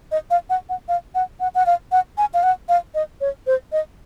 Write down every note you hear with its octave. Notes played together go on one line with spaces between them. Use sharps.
D#5
F5
F#5
F#5
F5
F#5
F#5
F#5
F5
F#5
G#5
F5
F#5
F5
D#5
C#5
C5
D#5